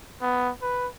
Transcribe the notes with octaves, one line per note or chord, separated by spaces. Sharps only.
B3
B4